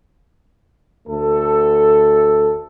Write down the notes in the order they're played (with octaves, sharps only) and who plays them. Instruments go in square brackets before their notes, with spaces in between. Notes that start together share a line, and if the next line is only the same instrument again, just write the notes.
[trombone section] D2 A3 A4